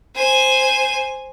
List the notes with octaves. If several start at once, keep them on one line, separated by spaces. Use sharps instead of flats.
C5 G#5